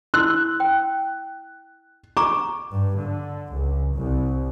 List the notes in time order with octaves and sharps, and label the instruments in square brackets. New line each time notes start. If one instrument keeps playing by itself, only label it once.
[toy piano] E4 C6 E6 [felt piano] F#6
[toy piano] G5
[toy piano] A#5 C#6 [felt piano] D6
[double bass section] G2
D3
C#2
C2